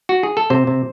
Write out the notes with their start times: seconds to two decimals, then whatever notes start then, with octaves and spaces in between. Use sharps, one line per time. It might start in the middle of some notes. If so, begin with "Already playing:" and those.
0.09 F#4
0.23 G#4
0.37 A4
0.50 C3 C5
0.67 C3